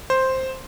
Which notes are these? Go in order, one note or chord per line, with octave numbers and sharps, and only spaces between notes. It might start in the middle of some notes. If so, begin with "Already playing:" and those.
C5